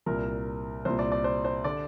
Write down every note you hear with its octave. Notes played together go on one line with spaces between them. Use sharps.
C2 A#2 A#4
C2 A#2 C5
D5
D5
C5
C5
D3 D5